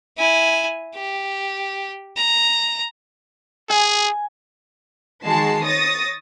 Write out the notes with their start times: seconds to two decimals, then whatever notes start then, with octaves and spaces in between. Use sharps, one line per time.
0.17 E4 G#5
0.95 G4
2.17 A#5
3.70 G#4 G#5
5.25 D#3 G#3 F#4 A5 C7
5.64 C#5 D#6 A6 A#6